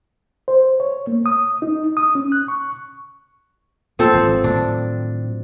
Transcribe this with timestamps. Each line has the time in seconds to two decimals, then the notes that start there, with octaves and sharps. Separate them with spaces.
0.48 C5
0.80 C#5
1.07 A#3
1.26 D#6
1.62 D#4
1.97 D#6
2.15 C#4
2.32 F#6
2.48 C#6
3.99 G2 F3 C4 A4
4.13 G#1 G#2
4.44 A2 D#3 F#3 D4